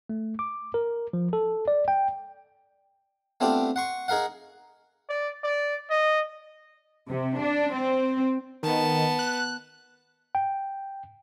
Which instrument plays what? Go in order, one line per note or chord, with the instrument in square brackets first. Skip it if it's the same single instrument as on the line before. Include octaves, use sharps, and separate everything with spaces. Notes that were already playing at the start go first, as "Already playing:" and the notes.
[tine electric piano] A3
D6
A#4
F3
A4
D5
G5
[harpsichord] A3 B3 C4 D4 F4 G4
F#5 C6 C#6
D#4 G#4 A#4 F5 F#5
[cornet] D5
D5
D#5
[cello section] C3
D4
C4
[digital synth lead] D#3 [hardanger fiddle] B3 A5
[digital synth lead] F#6
[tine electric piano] G5